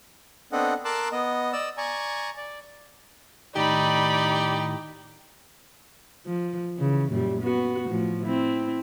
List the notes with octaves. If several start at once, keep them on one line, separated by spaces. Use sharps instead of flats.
B3 C4 D4 A4 D#5 F#5
A#4 A5 C6 D6 E6 F#6
B3 D#5
D5 D#5 E6
D5 G#5 A#5 C#6
D5
A2 D#3 D#4 G4 D5 B5
F3
C#3 E3
F#2 A#2 G3
B3 F#4
A2 F3
C4 E4